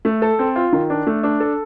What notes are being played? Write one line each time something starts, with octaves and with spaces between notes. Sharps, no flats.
A3
A4
C4
F4
D#3
D4
A3
D4
A4